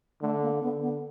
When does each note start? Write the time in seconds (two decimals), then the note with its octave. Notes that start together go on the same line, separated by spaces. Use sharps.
0.21 D3 A3
0.42 A#3
0.62 D3 B3
0.82 B3